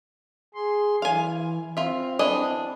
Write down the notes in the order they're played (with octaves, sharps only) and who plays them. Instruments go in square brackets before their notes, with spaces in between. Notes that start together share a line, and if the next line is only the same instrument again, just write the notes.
[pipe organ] G#4 C6
[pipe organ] E3 [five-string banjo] F5 G#5
[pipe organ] C4 [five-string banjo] F4 E5
[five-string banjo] E3 D4 D#5